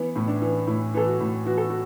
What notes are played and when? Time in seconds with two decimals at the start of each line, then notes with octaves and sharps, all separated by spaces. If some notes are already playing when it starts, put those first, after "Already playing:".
Already playing: E3 B3
0.16 A2 E4
0.28 D4
0.42 E3
0.67 A2 E4
0.94 E3 A4
1.07 F#4
1.20 A2
1.45 E3 F#4
1.58 A4
1.70 F#4